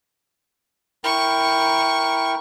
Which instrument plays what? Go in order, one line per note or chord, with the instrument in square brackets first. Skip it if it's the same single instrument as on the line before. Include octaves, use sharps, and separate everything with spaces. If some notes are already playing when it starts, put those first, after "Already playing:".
[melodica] E4 A#4 G5 [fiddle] C#6